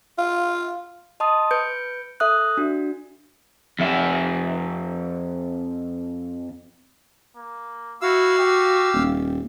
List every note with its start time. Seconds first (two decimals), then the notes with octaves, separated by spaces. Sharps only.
0.18 F4
1.20 D#5 A5 C6 D#6
1.51 B4 G6 C#7 D7
2.20 A4 E5 D#6 F#6
2.57 D4 F#4
3.79 F2 E5
7.36 A#3
8.02 E4 F#4 F5 E6
8.39 G4
8.94 D#1